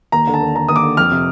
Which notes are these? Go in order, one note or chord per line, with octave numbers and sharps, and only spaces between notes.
D#2 A#5
D3
A5
D#2
D3 A#5
D#2 D#6
D6
D3
F2 F6
C3